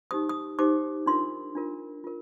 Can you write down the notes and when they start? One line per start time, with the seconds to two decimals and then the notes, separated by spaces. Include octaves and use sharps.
0.11 D#4 G4 C5 D#6
0.29 D#6
0.59 D#4 G4 C5 D6
1.06 D4 F4 A#4 C6
1.55 D4 F4 A#4
2.04 F4 A#4